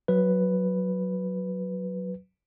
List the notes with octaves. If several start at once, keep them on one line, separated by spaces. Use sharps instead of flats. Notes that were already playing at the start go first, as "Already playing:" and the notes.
F#3 B4